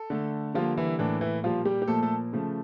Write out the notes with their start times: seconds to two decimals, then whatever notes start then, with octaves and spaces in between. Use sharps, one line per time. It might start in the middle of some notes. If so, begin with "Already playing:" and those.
Already playing: A4
0.10 D3 A3
0.54 D3 F3 G3 A#3 F4
0.77 E3 E4
0.99 A2 E3 A#3 D4
1.21 E3 E4
1.43 A#2 F3 G3 A#3 F4
1.65 G3 G4
1.82 G4
1.88 A#2 F3 A3 A#3 A4
2.02 A3 A4
2.33 C#3 F3 A3